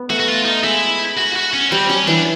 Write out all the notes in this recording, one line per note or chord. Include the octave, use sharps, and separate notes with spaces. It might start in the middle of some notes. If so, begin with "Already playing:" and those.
Already playing: B3
A3 F#4
F#4
F4
D#4
G#3 E4
F#4
F#4
C#4
G3 C4
F#3 C#4
E3 D4